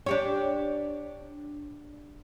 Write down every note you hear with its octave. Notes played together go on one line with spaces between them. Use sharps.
D4 G4 C#5